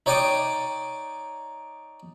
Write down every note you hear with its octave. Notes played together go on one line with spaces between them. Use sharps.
D#4 C#5 D5 G5 D6 D#6